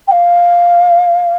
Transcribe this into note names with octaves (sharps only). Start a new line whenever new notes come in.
G5
F5